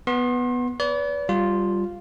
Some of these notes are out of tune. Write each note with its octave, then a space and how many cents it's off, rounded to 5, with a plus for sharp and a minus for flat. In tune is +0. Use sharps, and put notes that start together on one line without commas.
B3 +0 C6 +35
B4 +0 D5 -40
G3 +0 F4 +0